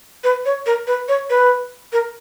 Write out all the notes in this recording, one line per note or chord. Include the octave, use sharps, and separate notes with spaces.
B4
C#5
A#4
B4
C#5
B4
A#4